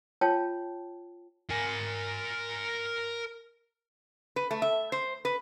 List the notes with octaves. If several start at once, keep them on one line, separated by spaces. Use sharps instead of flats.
F4 C#5 G5 A5
A#4 G#5
B4
A3
E5
C5
B4